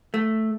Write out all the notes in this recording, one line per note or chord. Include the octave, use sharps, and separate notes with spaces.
A3